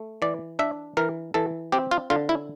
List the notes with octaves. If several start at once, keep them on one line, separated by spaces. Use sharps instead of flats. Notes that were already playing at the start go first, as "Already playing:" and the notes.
Already playing: A3
E3 D5
D4 E5
E3 A#4
E3 A4
C4 G4
F4
D3 F4
E4